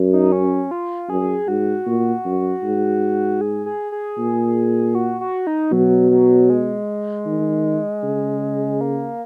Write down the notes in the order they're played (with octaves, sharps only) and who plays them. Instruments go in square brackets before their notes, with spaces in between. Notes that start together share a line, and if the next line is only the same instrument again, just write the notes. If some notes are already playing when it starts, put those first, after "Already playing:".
Already playing: [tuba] F#2
[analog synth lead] D#4
C#4
F4
[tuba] F#2 [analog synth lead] G#4
[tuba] G#2 [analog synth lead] F#4
[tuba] A#2
F#2
G#2
[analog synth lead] G#4
G#4
G#4
[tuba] A#2
[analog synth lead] F#4
F#4
D#4
[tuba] B2 [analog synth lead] F#3
[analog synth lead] F#3
G#3
[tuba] D#3
C#3
[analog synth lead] A#3